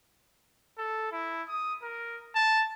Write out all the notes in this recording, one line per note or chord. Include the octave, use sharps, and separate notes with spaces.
A4
E4
D#6
A#4
A5